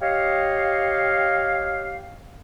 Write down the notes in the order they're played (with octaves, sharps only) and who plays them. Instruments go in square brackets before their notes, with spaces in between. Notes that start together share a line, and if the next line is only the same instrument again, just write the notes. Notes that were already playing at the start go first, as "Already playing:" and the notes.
[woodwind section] G4 C#5 D#5 F5